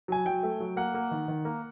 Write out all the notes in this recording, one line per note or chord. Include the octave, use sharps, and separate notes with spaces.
F#3 G#5
F#3 G5
A3
F#3
A#3 F#5
A#3
D#3
D#3
A#3